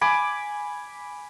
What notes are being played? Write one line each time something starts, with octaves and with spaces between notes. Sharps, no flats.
G#5 B5 D6